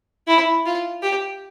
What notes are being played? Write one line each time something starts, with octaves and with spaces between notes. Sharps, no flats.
E4
F4
G4